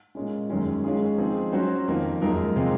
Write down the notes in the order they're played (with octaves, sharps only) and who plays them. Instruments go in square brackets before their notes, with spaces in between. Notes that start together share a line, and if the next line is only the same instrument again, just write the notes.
[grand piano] A#2 G#3 C#4
F#2 D#3 G#3 C#4
D#3 G#3 C#4 F4 G#4
F3 C4 D#4 G#4
F#3 C#4 F#4 C5
F2 D#3 A#3 F4
F#2 F3 G#3 D#4 A#4
C3 F3 G#3 C4 F4